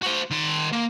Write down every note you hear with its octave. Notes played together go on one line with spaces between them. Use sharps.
F#4 C5
D#3 C6
A#3